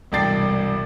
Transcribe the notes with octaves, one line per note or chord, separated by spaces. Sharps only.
E1 C2 G2 G5 A6 C7